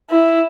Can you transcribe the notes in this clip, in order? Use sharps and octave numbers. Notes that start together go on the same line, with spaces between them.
E4